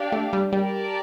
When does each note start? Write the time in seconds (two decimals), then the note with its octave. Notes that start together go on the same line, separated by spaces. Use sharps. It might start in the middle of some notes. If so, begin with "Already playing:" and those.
Already playing: D4 G4 D5 F5
0.12 A3
0.33 G3
0.52 G3 G4 A#4 D5 A5